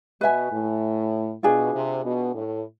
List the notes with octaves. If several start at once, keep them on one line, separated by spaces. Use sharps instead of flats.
B2 B4 E5 G#5
A2
B2 D4 F4 G#4
C3
B2
A2